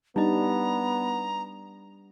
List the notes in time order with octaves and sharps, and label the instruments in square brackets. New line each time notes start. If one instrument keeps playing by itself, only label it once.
[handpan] G3 D4 [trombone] B3 [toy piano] D#4 D#5 [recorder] A#5